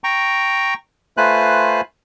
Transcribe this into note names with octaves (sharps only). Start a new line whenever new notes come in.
G5 A#5 C#6
A3 F4 B4 C5 G#5 F#6